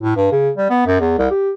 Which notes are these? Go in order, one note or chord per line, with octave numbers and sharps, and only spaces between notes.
A2
G2
C#3
G3
B3
F#2
E2
C2
G4